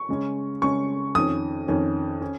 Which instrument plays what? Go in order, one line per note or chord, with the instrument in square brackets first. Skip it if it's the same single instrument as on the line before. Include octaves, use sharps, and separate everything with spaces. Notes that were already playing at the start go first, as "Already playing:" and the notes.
Already playing: [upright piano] C#6
C#3 G#3 C#4
C#3 G#3 C#4 C#6
F2 D#3 C#4 D#6
F2 D#3 C#4
C#4